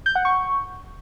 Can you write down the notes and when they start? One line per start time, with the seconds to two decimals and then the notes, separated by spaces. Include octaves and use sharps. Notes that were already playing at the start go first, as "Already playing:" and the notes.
0.06 G6
0.15 F#5
0.25 C#6